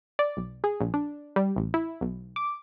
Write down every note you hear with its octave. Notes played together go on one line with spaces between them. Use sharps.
D5
B1
G#4
A#1
D4
G3
A1
E4
B1
D6